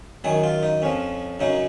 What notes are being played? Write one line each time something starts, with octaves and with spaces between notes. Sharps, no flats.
F#2 D#3 F#3 G#4
F4
D#4
F2 F3 C#4
F#2 C#3 F#3 D#4